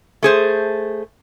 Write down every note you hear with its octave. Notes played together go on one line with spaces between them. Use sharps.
A3 G#4 C5